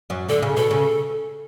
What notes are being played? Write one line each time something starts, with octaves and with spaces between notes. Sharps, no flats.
F#2 F#3
D2 D3 A4
C#3
B2 A4
C#3